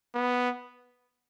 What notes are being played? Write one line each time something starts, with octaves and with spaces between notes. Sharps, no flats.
B3